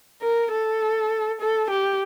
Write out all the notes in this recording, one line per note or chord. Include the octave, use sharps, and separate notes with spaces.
A#4
A4
A4
G4